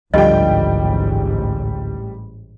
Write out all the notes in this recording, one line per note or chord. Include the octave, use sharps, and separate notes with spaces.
A1 D2 G#2 D3 F3 G3 D#5 G5